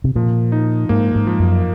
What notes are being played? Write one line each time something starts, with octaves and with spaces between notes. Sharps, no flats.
C3
A#2 F3
D#4
G#2 A#3
G#2
F3
F#2